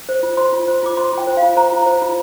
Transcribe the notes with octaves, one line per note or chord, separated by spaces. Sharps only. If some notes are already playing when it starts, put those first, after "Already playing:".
C5
F4
C5 C6
F4
C5
F4 D6
C5 C6
F4 G5
C5
F5
F4
C5 A#5
F4
C5
F4